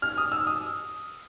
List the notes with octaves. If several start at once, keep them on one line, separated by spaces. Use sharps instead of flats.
F6
D#6
E6
D#6